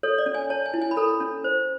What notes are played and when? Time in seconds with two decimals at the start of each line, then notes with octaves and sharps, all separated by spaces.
0.03 A4 C#5
0.18 D5
0.26 C#4
0.34 G#5
0.50 C#5 A5
0.66 G#5
0.74 E4
0.81 G#5
0.91 B5
0.97 A4 A#5
1.20 C#4
1.44 C5